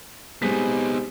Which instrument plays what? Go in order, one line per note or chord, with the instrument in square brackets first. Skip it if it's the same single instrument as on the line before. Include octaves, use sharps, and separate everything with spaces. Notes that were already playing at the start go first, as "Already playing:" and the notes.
[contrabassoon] C3 [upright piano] G#3 B6 [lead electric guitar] B3 D#4